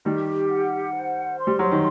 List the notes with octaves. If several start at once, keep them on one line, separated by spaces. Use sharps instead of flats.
D#3 G3 G4
F#5
C5
C6
G3
F#3
D#3